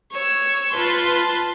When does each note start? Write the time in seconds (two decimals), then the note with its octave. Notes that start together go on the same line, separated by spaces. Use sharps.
0.12 C#5 E6
0.73 F4 B4 A5 C6